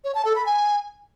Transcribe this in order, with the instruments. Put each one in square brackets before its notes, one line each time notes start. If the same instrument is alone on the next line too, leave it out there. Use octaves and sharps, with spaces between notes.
[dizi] C#5
A5
A4
B5
G#5